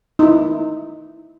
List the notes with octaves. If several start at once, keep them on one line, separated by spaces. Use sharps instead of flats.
D#4 E4